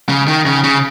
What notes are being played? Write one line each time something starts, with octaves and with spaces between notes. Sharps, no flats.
C#3
D#3
C#3
C#3